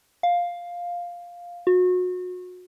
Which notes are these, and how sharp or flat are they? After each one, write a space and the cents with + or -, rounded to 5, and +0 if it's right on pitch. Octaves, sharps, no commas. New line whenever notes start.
F5 +5
F#4 -30